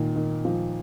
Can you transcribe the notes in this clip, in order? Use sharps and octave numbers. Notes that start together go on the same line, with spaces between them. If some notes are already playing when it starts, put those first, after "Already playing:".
Already playing: A#2 D#3
D#3
F3